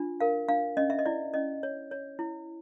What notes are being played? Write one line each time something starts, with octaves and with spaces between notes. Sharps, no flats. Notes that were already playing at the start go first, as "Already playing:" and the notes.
Already playing: D4 F4
A#4 F5
D4 F5
C#4 D#5
E5
D#5
E4 D5
C#4 D#5
C#5
C#5
E4